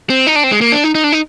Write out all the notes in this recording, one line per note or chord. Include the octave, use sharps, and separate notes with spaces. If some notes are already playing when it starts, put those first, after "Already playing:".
C4
D#4
D4
C4
G#3
A#3
D4
D#4
D#4
D4
D#4